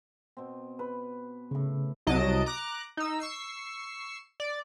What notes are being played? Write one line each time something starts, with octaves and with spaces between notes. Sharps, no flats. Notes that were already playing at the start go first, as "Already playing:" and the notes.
B2 C4
B4
A2 C#3 C#6
C2 F#3 D#5 A5 D7
A#5 D6 F#6
D#4 E6
C#6 E6 C7
D5